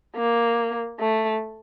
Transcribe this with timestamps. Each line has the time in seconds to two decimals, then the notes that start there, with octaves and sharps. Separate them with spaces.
0.16 A#3
1.00 A3